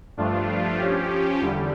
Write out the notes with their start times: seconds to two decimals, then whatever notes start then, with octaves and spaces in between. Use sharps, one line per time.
0.17 G2 F3 A3 D4 F4
0.78 F3 C#4 G4
1.40 E2 D3 G3